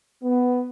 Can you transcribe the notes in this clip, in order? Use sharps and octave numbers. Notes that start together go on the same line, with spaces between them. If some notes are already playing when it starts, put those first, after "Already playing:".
B3